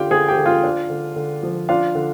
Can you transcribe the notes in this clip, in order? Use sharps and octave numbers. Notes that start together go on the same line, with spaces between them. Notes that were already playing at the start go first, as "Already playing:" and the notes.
Already playing: D3 D4 F4 G4 F5 G5
D3 G#4 G#5
G4 G5
D3
F4 F5
D4
D3
D3
F3
D4 F4 F5
D3